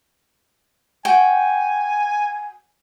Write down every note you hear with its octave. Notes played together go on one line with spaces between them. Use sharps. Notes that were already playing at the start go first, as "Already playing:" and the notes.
F#4 G5 G#5